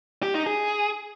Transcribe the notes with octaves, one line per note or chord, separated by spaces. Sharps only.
G4
D#4
G#4